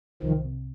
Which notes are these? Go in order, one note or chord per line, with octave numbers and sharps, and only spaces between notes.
C2 D#3 F3
C3